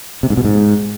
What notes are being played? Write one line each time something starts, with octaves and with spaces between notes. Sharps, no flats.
C3
G#2
B2
G#2